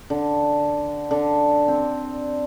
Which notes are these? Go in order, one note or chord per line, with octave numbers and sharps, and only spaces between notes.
D3
D3
C4